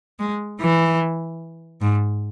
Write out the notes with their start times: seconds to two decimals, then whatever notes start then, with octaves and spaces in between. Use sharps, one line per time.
0.19 G#3
0.61 E3
1.81 G#2